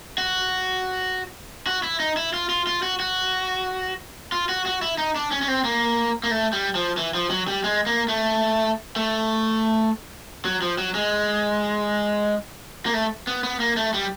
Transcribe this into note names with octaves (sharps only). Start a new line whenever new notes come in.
F#4
F#4
E4
D#4
E4
F4
F4
F4
F#4
F#4
F4
F#4
F#4
E4
D#4
D4
C#4
C#4
C4
A#3
A#3
A3
G3
F3
E3
F3
F#3
G3
G#3
A#3
A3
A3
F#3
F3
F#3
G#3
A#3
A3
B3
B3
A#3
A3
G3